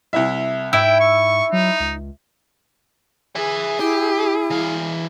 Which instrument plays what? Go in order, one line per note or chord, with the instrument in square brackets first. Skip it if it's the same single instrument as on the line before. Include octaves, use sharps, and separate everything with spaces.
[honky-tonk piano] C2 E4 E5
[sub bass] G#2 [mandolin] E4 [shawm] G5 [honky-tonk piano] E6
[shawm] C#6
[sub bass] F#3 [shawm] D#4
[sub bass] C#2
[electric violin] G#4 [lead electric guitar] E5 G#5
[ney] E4 [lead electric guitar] G4
[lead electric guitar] E3 F5